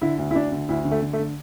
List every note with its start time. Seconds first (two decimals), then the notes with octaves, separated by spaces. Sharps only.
0.02 D3 E4
0.18 D2
0.31 E4
0.35 D2 D4
0.52 D3
0.69 D2 E4
0.85 D3
0.91 A3
1.02 D3
1.13 A3
1.19 D3